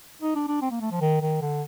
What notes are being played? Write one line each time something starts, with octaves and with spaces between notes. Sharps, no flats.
D#4
D4
D4
C4
A#3
A3
F3
D#3
D#3
D3